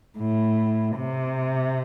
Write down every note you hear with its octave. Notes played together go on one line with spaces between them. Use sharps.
A2
C3